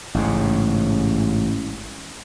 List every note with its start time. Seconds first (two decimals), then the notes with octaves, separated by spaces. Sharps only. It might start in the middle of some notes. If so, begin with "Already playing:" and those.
0.14 A1 G#2 C#3